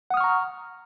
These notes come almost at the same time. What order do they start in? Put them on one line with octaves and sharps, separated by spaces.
F#5 D#6 F6 C#6 A#5